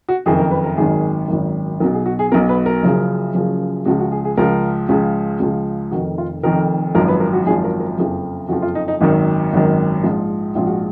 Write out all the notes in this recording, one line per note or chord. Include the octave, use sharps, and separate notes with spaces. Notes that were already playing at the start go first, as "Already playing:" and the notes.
F#4
F#1 F2 D#3 G#4
A#4
B4
A#4
G#1 F#2 D#3 G#4
G#1 F#2 D#3
B1 B2 A#4
G#4
F#4
G#4
B1 B2 A#4
B4
A#4
F#1 F#2 C#3 F3
F#1 F#2 C#3 F3
C#2 C#3 F3 F#4
F#4
G#4
G#4
C#2 C#3 F3 A#4
C#2 C#3 F3
C#2 C#3 F3
F1 F2 D#3 F#4
F4
F1 F2 D#3 A#4
G#1 F#2 F3 A#4
B4
A#4
F#4
G#1 F#2 F3 G#4
A#4
A#4
F#1 F2 F3 G#4
F#1 F2 F3 F#4
F4
D#4
D#4
G#1 F#2 D#3 D#4
G#1 F#2 D#3
A#1 G#2 F3
A#1 G#2 F3 F4
F#4